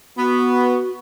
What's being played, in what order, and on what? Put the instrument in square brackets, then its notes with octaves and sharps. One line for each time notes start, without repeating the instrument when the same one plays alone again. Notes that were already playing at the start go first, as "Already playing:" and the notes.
[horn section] B3 [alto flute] F#4